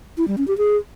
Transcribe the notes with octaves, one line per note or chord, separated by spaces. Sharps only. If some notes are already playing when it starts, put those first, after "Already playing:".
E4
G3
C#4
G4
G#4